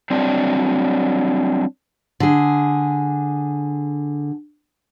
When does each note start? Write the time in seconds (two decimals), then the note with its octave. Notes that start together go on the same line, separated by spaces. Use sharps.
0.10 F#3 G3 C4 D4 D5
2.20 D3 G#4